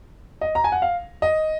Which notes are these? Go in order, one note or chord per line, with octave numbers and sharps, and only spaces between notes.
D#5
A#5
G#5
F#5
F5
D#5